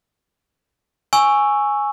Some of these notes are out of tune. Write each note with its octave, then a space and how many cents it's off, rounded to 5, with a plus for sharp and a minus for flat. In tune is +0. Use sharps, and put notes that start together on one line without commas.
G#5 +0 C#6 +0 E6 +0